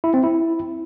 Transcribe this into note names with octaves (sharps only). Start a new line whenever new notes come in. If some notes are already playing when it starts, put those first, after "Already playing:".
E4
C4
E4